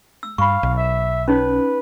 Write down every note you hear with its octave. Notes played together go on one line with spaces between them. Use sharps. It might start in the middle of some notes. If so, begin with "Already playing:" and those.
E6
G2 F5 B5 C#6
B1
E5
C#4 D#4 B4 C#5